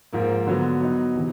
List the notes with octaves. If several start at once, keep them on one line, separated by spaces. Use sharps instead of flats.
G#2 F3 A#3
D3 F#3 B3
F#3 B3 D#4
C3 E3